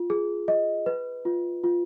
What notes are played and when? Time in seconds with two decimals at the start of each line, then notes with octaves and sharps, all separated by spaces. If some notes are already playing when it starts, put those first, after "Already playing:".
Already playing: F4
0.10 G#4
0.48 D#5
0.86 B4
1.25 F4
1.64 F4